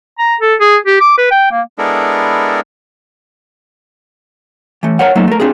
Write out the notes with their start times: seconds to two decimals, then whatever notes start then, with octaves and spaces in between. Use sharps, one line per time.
0.19 A#5
0.41 A4
0.60 G#4
0.86 G4
1.00 D6
1.17 B4
1.31 G5
1.51 A#3
1.78 G#3 B3 D4 E4 A4 A#4
4.83 E3 A3
4.99 A#4 C5 C#5 F5 F#5
5.15 F#3 A3 A#3 D#4 C5
5.28 A3 A#4
5.40 C4 D4 F4 G#4